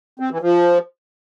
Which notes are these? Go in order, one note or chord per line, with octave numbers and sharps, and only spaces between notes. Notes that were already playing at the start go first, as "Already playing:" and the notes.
C4
E3
F3